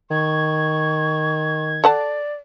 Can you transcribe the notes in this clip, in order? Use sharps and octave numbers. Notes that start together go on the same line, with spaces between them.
D#3 C#6 G#6
A4 D5 F#5 A5